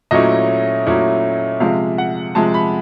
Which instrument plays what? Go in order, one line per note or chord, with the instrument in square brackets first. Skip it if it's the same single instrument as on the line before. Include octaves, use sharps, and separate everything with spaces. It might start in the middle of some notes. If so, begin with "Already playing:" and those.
[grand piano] A#2 F#3 A3 C#4 E4 D#5
A#2 F#3 A3 C#4 E4
C3 F3 G#3 F5
F#5
C3 F3 G#3 A5
B5